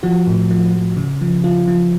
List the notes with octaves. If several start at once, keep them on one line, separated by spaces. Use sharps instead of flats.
F3 F#4
A2
F3
F3
C#3
F3
F3 F4
F3